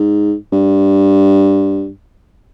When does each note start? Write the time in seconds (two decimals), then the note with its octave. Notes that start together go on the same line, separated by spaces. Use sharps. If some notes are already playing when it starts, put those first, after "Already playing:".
Already playing: G#2
0.52 G2